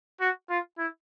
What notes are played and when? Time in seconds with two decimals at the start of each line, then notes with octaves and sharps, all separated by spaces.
0.20 F#4
0.49 F4
0.78 E4